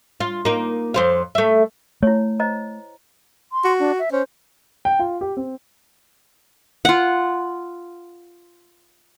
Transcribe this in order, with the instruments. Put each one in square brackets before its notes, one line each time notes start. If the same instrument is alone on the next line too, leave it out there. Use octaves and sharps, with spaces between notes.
[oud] F4
A#3 D#4
F2 C5 F5
A3 E5
[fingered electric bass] A3 [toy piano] E4 C#5
[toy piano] C5 D#5 A#5
[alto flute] C6
[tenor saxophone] F#4
[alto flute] D4
E5
[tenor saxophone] C#4 [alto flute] C5
[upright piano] G5
F4
G4
C4
[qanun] F4 F#5